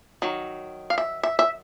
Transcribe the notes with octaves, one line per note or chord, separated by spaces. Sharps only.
D#3 F#3
F5
E5
E5
E5